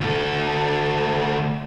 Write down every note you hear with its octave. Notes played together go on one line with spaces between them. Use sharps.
D2 A4